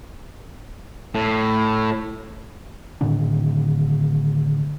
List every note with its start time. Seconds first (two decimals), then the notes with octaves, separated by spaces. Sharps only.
1.15 A2
3.01 A2 D3 D#3 D4